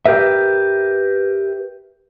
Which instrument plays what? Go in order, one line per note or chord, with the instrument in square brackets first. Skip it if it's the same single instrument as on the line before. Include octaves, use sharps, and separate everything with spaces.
[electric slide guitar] G4 A#4 B4 E5